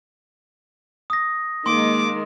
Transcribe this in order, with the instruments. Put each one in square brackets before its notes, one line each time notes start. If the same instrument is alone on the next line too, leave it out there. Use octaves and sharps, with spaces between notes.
[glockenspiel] D#6 A#6
[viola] D#3 G#3 [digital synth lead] A#3 [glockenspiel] C6 [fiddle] D6